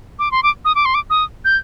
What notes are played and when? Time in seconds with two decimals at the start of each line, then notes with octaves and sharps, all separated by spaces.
0.19 D6
0.31 C6
0.43 D6
0.65 D#6
0.75 D6
0.85 C6
0.95 D6
1.10 D#6
1.45 G6